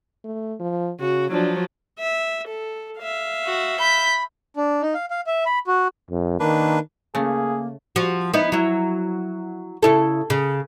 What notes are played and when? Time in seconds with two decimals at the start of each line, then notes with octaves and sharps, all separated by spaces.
0.24 A3
0.60 F3
1.00 C#3 F#4
1.32 F3 F#3 D4
1.99 E5
2.47 A4
2.99 E5 F5
3.45 F#4
3.80 B5 G6 B6
4.57 D4
4.82 D#4
4.94 F5
5.11 F5
5.27 E5
5.46 B5
5.67 F#4
6.11 F2
6.40 D#3 A#3 D4 B4
7.15 C#3 A3 A#3 G#4
7.96 F3 F#4
8.34 B3 D#4 E4
8.52 F#3 E4
9.83 C#3 E4 A4
10.30 C#3